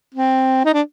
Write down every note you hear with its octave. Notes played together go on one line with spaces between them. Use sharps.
C4
D#4
D4